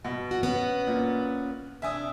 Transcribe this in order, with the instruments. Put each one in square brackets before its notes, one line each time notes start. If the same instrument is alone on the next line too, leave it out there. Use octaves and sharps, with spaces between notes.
[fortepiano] B2
[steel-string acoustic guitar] F#4
B3 C#4 B4
[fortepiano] A#2
[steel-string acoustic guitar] C3 D4 [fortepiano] E5 G#5 D#6